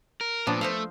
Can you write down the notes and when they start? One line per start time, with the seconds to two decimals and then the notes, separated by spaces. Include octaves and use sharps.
0.21 A#4
0.47 A#2 F3 B3 D4
0.61 A3 C5 D#5 F5